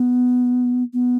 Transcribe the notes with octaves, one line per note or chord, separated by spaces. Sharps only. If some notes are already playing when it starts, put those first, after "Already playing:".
Already playing: B3
B3